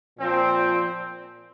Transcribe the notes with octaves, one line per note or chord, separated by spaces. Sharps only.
A#2 F3 C4